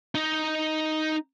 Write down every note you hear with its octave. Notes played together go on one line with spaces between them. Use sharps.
D#4 D#5